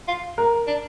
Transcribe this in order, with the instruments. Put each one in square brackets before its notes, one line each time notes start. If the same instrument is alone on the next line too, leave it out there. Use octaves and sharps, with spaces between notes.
[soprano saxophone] F4
[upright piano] A#4
[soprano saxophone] D4